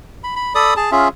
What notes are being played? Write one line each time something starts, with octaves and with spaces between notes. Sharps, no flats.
B5
B5
A4 D5 B5 D#6
G#4 A5
C#4 F4 G#4 E5